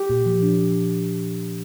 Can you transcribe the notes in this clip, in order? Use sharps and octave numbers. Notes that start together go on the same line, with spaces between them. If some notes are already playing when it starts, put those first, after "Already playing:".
Already playing: G4
A#2
F3
D4
F3